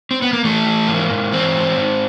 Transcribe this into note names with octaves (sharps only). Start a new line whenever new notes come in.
C4
B3
A#3
E3 A3
E3
G#2 A#3
G#2
E3 C4
G#2
G#2